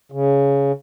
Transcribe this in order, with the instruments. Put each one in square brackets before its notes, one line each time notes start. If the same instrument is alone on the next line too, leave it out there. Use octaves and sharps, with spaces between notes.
[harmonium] C#3